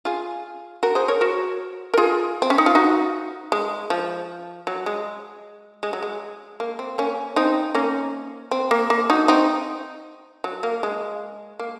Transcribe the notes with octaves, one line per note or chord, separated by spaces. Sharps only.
F4 G#4
F#4 A#4
G#4 C5
A#4 C#5
F#4 A#4
A#4
F4 G#4
C4
C#4
D#4
F4
D#4 F#4
G#3
F3
F#3
G#3
G#3
F#3
G#3
A#3
C4
A#3 C#4
C4 D#4
A#3 C#4
C4
A#3
A#3
D#4 F#4
C4 D#4
F#3
A#3
G#3
A#3